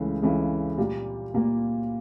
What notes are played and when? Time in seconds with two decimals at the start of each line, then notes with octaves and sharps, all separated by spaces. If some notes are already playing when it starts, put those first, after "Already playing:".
Already playing: C#2 C#3 E3 A3
0.23 C#2 C#3 E3 A3
0.78 A#2 G3 A#3
1.34 A#2 G3 A#3